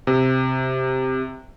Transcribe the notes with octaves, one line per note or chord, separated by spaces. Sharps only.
C3